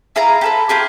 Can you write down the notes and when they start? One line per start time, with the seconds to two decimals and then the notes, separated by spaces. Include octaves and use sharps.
0.16 E4 G#4 F5 A#5
0.41 G4 A4 B4
0.69 F4 G4 G#4